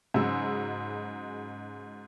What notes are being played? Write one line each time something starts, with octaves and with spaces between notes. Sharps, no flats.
G#2 C#3 F#3 G#3 E6